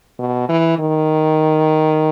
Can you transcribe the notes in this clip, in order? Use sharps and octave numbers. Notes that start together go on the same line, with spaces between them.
B2
E3
D#3